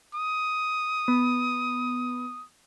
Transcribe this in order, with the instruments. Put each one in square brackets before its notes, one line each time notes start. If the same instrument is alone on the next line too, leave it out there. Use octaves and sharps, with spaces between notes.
[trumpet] D#6
[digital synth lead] B3